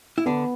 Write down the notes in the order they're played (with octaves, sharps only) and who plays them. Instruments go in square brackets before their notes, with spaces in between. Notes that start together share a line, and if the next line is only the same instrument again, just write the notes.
[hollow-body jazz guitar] E4
[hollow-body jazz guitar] D3 D4 [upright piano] B3